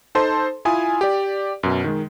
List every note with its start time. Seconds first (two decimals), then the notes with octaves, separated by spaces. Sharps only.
0.15 D#4 A4 C5 A5 C6
0.65 E4 F4 G#5 D#6
1.01 G4 D5
1.63 F#2 B2
1.84 D#3 G#3